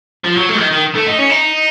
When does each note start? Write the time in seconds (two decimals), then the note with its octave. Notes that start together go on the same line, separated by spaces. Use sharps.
0.24 F3
0.37 F#3
0.49 A3
0.59 D#3
0.71 D#3
0.95 A3
1.06 D#4
1.18 C#4
1.30 D#4